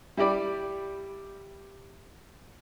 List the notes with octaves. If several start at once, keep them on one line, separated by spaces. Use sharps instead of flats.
G3 E4 G4 D5 B5